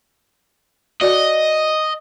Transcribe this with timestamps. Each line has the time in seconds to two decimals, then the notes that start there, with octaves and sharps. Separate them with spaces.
1.01 F#4 A4 D5 D#5